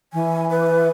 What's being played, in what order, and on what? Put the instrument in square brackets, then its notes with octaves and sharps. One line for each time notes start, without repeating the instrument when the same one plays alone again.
[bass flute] E3 [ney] G#5
[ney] B4